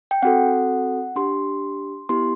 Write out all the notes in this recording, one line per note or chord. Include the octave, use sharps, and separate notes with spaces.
G5
C4 F#4 A4 F#5
D4 G4 C6
B3 E4 G4 C6